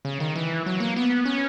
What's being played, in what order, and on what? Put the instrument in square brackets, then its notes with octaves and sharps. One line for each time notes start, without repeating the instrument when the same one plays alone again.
[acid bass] C#3
D#3
E3
F#3
A#3
B3
C#4